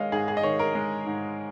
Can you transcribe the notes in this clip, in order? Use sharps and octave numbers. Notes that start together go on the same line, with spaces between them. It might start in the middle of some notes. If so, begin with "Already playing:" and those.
Already playing: D#3 G#3 C#5 D#5 F5
G#2 G#4
G#4
D#5
D#3 C#5
A#4
G#3
G#2